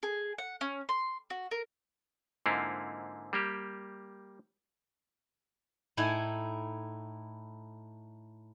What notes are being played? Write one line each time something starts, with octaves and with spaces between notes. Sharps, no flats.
G#4
F#5
C#4
C6
F#4
A#4
G#2 D3 A#3 C4 E4 F4
G3 A#3 G4
A2 D#4 E4 G#5